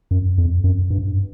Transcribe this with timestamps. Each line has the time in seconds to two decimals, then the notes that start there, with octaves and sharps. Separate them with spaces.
0.11 F#2
0.38 F2
0.64 F#2
0.90 G2